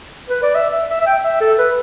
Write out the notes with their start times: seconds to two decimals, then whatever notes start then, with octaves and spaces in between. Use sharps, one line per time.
0.30 B4
0.43 D5
0.55 E5
0.72 E5
0.90 E5
1.01 E5
1.06 G5
1.24 E5
1.41 A4
1.58 B4